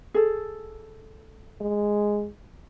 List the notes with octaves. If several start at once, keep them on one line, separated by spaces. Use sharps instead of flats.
G#4 A4
G#3